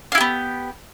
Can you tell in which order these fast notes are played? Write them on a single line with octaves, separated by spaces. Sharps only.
F4 E4 G4 B3